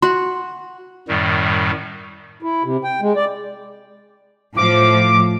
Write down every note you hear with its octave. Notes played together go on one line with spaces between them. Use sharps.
F#4 C6
F#2 A2 D#3 G3
E4
C3
G5
G#3
D5
A2 F3 D6